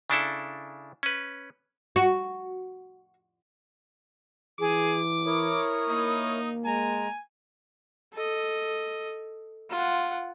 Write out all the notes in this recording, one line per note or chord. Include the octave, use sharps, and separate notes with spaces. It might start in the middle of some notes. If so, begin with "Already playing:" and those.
C#3 D4 E4 A4
C#4 B4
F#4
E3 G#4 D6
E4 A#4 C#5 D#6
A#3 D#4
G#3 G#5 A#5
A4 D#5
F4 F#5